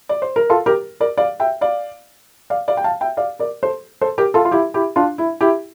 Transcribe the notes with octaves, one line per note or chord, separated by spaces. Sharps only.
D5
C5
A#4
F4 A4
G4 A#4
A#4 D5
D5 F5
E5 G5
D5 F5
D5 F5
D5 F5
G5
F5 A5
E5 G5
D5 F5
A#4 D5
A4 C5
A4 C5
G4 A#4
F4 A4
F4
E4 G4
E4 G4
D4 F4
E4
E4 G4